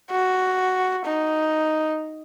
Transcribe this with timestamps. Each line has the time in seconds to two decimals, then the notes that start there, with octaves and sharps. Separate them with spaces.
0.11 F#4
1.06 D#4